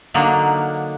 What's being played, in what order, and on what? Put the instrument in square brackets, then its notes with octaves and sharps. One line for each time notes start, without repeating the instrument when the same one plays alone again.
[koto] D3 F#3 A#3 D4 D#4